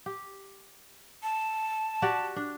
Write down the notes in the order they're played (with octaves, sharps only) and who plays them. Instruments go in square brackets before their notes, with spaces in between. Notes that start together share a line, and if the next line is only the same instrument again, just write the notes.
[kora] G4
[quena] A5
[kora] F#4 G4 D5
D4